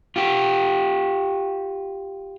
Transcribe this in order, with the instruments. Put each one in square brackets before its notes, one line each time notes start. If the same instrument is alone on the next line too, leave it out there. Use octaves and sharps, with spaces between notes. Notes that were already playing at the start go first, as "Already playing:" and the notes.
[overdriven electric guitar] F4 G4